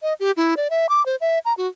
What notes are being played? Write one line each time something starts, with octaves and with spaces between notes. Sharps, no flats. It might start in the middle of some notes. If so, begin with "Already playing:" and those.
D#5
G4
E4
D5
E5
D6
C5
E5
A#5
F#4